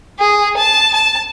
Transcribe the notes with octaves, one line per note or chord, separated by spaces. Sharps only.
G#4
A5
A5